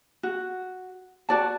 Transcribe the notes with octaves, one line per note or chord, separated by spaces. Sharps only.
F#4
F#4 D5 A5